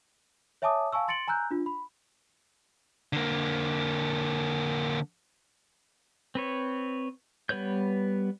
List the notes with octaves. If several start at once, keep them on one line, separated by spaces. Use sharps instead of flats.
C#5 E5 G#5 A5 D6 D#6
F5 G#5 A5 C#6 E6
C6 A6 C#7 D7 F#7
G#5 A#5 E6 F#6 G6
D4 F4
B5
D3 A#3
C4 B4 C#5
G3 B3 B4 C#5 G6